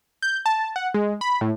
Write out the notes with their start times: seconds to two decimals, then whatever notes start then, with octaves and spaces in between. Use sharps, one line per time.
0.22 G6
0.46 A5
0.76 F#5
0.94 G#3
1.21 B5
1.41 A2